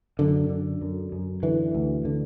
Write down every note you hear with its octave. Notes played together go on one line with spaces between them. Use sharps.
F#2 D3
D3
F#2
F#2
D3 E3
D2
D3